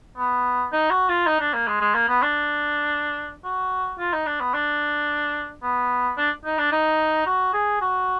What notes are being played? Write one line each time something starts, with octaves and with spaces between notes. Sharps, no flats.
B3
D#4
F#4
F4
D#4
D4
A#3
G#3
G#3
A#3
B3
D4
F#4
F4
D#4
D4
B3
D4
B3
D4
D#4
D4
D#4
F#4
G#4
F#4